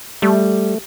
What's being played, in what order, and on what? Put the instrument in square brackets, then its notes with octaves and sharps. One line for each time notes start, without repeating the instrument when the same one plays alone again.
[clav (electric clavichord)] G3 [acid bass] A3